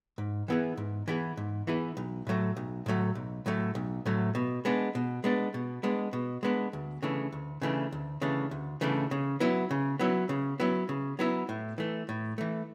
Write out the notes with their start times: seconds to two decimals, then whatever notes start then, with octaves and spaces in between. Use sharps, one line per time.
0.18 G#2
0.48 E3 B3 E4 G#4
0.77 G#2
1.08 E3 B3 E4 G#4
1.37 G#2
1.67 E3 B3 E4 G#4
1.97 B1
2.27 A2 F#3 A3
2.57 B1
2.86 A2 F#3 A3
3.15 B1
3.46 A2 F#3 A3
3.75 B1
4.06 A2 F#3 A3
4.35 B2
4.65 G#3 B3 D4
4.95 B2
5.24 G#3 B3 D4
5.54 B2
5.83 G#3 B3 D4
6.13 B2
6.43 G#3 B3 D4
6.73 D2
7.02 C#3 E3 A3 D4
7.32 D2
7.62 C#3 E3 A3 D4
7.92 D2
8.21 C#3 E3 A3 D4
8.51 D2
8.81 C#3 E3 A3 D4
9.11 C#3
9.40 F#3 B3 E4
9.71 C#3
9.99 F#3 B3 E4
10.29 C#3
10.60 F#3 B3 E4
10.89 C#3
11.19 F#3 B3 E4
11.49 A2
11.78 E3 A3
12.09 A2
12.38 E3 A3